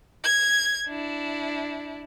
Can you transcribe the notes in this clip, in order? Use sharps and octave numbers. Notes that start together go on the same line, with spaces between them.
G#6
D4 E4